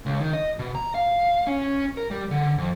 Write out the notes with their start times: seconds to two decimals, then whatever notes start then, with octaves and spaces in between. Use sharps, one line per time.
0.06 C#2
0.21 D#3
0.33 D#5
0.59 B2
0.75 A#5
0.95 F5
1.47 C#4
1.97 A#4
2.11 G3
2.31 D3
2.58 F2